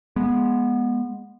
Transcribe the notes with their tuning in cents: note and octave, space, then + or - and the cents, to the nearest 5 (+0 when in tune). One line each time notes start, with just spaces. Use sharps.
G#3 +0 B3 -20